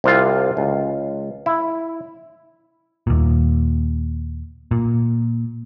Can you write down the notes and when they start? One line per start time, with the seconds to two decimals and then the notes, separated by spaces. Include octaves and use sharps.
0.04 C2 C3 F4
0.57 C#2
1.46 E4
3.07 D#2 A#2
4.71 A#2